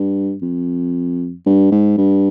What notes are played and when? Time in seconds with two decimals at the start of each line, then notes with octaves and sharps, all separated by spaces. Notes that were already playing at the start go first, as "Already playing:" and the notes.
Already playing: G2
0.42 F2
1.46 G2
1.72 G#2
1.98 G2